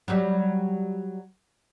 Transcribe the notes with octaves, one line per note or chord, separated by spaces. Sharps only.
F#3 G3